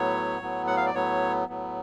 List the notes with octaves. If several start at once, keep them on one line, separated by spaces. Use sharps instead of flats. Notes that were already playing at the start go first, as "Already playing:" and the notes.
Already playing: A2 F#3 B3 C#5
A2 F#3 B3
F#5
F5
D5
A2 F#3 B3 C#5
A2 F#3 B3